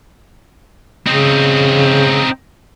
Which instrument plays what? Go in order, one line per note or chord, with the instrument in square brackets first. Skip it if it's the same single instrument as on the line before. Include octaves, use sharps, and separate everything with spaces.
[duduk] C#3 [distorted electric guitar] C4 D#4